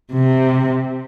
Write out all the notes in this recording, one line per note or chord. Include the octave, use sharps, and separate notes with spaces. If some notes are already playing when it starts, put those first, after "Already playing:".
C3